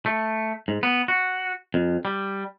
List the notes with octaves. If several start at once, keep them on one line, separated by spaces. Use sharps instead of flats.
A3
G#2
B3
F#4
F2
G3